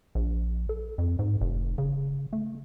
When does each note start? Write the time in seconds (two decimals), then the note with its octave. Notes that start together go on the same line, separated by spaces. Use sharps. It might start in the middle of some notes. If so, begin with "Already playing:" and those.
0.15 A#1
0.69 A4
0.98 F2
1.19 G#2
1.41 F1
1.78 C#3
2.33 A3